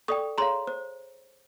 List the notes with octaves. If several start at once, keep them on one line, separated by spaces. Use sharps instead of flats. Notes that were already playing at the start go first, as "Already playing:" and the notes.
A4 D5 G5 C#6 D#6
G#4 C#5 F5 A#5 C6
C5